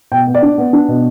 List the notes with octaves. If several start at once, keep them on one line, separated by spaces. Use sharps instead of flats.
B2 G5
B3
D5
D4
B3
D4
B2